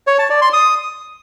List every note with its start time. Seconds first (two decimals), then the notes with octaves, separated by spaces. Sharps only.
0.07 C#5
0.19 A5
0.30 D5
0.42 C6
0.53 D#6